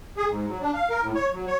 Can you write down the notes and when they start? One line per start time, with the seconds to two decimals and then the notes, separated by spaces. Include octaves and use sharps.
0.17 G#4
0.29 G#2
0.48 F#3
0.61 D4
0.74 F5
0.90 A#4
1.03 A2
1.15 C#5
1.33 F#3
1.47 C#5